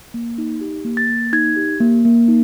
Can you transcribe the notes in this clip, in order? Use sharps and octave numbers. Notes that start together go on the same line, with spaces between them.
A#3
D#4
G4
A#3
A6
A#3
D#4 G#6
G4
A#3
A#3
D#4